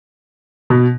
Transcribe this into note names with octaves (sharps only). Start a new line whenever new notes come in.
B2